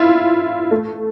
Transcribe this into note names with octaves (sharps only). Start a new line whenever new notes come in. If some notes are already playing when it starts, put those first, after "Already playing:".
Already playing: E4 F4
A3